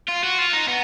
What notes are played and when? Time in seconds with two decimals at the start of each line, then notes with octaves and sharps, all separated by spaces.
0.08 F4
0.23 F#4
0.38 F4
0.53 D#4
0.68 B3